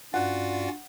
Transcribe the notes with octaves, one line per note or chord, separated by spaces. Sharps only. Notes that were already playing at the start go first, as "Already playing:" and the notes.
G2 C#4 F4 F#4 D5 F#5